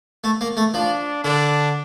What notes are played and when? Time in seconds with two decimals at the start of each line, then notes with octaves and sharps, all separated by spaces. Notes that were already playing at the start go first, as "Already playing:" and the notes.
0.24 A3
0.41 A#3
0.57 A3
0.74 F3 D4
1.24 D3 D4